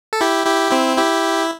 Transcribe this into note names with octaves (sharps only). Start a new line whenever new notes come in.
A4
E4 G4
E4 G4
C4 E4
E4 G4